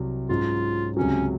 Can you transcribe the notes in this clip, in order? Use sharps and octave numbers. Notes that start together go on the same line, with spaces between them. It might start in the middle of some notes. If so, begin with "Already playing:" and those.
Already playing: C2 C3 F#3
G#2 F#3 C#4 F4
C#2 C3 F#3 C#4